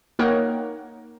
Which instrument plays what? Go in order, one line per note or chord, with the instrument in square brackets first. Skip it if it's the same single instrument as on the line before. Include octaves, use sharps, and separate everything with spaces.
[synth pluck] A#3 D#4 A#4 C#5 F#5 G5